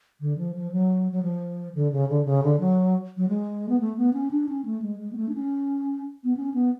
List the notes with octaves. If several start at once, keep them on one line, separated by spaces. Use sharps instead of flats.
D3
F3
F3
F#3
F#3
F3
D3
C#3
D3
C#3
D3
F#3
F#3
G#3
B3
A3
B3
C#4
D4
C#4
A3
G#3
G#3
B3
A3
D4
C#4
B3
C#4
B3